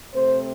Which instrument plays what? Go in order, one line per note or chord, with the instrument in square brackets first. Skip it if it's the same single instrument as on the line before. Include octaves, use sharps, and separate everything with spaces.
[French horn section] C3 A3 C4 C5